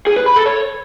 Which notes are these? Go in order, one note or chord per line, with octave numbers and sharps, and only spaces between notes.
G#4
B4
B5
A4
C#5